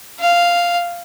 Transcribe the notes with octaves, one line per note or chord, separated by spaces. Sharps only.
F5